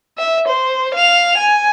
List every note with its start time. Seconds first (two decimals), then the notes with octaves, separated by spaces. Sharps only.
0.18 E5
0.48 C5
0.94 F5 F7
1.38 G#5